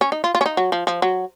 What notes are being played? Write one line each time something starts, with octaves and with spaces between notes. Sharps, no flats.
C#4
D#4
F4
F4
C#4
D#4
F#3
F3
F3
F#3